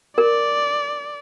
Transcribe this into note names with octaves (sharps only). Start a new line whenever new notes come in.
A#4 D5